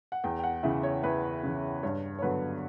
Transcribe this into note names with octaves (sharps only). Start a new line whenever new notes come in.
F#5
E2 G5
G5
F#5
C#3 E3 E5
C#5
E2 B4
C#3 E3
G2 C#5
C#5
D3 F#3 B3 B4